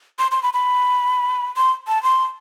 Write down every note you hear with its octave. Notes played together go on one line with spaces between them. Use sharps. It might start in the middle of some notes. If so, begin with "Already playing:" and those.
C6
C6
B5
B5
C6
A5
C6